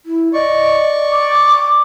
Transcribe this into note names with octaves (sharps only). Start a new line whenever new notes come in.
E4
D5 D#5 C#6
D6